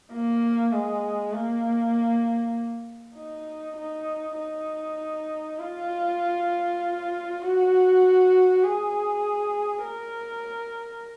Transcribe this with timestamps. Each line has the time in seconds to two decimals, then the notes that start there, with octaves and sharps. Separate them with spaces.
0.13 A#3
0.73 G#3
1.33 A#3
3.15 D#4
3.76 D#4
4.38 D#4
5.59 F4
7.41 F#4
8.63 G#4
9.84 A#4